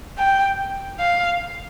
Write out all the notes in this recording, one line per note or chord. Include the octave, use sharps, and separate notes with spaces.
G5
F5